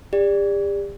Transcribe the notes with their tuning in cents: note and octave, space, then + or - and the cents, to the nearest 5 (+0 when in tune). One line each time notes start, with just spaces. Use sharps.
G4 +40 D5 +0